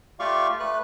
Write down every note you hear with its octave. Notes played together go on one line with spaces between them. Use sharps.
A3 F4 G4 D5 F5 C#6
A3 B4 F#6